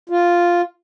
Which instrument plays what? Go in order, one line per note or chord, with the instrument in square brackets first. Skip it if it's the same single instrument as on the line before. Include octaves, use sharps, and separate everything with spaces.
[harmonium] F4